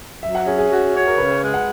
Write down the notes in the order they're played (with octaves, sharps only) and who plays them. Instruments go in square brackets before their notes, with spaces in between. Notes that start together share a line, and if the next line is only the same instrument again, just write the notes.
[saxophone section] F#3 [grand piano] E5
[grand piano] F#5
[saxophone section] C#4 [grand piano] G#4
[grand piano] G#4
[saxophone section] F#4
C#5
[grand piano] A#4
[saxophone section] C#3 [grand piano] B4
[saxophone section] G#3
[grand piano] F#5